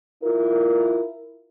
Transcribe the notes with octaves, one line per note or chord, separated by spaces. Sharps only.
E4 F4 A#4